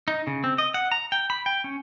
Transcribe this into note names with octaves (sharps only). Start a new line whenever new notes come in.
D#4
C#3
C4
D#5
F#5
A#5
G5
B5
G5
C#4